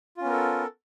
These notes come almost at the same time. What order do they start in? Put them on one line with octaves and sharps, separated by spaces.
F4 C#4 B3 A#4 A4